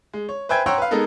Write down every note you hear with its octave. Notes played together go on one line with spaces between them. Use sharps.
G#3
C#5
B4 C5 E5 G5 G#5 G#6
C#5 F#5 G5 A#5 C6 E6
B4 F5
G#3 B3 D#4 A4 A#4